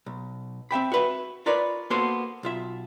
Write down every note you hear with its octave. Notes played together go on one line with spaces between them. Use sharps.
B1
C4 E5 G5 B5
F#4 B4 E5
F4 A#4 B4 C#5 D5
A#3 B3 F#4 A4 C5 C6
B1 F4 E5